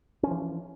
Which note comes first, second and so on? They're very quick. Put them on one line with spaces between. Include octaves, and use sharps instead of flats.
C#4 F3 E3